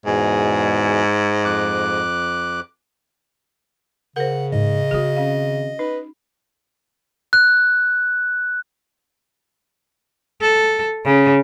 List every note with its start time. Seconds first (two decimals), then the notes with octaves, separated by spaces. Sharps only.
0.06 E2 G#2 B2 G#4
1.45 F2 D6 F#6
4.16 C#3 A#4 C5 F#5
4.52 G#2 D#5
4.91 D#3 C4 F#4 G#4
5.16 C#4 F5
5.79 D#4 B4
7.33 F#6
10.41 A4
11.04 C#3